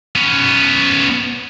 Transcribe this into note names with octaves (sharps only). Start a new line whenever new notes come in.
B3 C#4